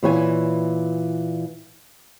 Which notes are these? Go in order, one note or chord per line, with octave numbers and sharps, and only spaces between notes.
A#2 E3 C#5 G5 G#5